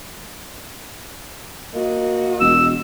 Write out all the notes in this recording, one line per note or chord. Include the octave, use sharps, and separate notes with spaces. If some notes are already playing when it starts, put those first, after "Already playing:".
A#3 F#4 D#5
E1 E6